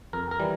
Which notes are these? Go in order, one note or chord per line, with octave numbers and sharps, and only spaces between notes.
F2 A#4
A#4
E3 G3